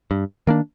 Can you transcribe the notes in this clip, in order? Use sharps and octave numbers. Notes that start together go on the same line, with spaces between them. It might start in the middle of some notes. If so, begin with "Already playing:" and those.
G2
D#3 A#3 D4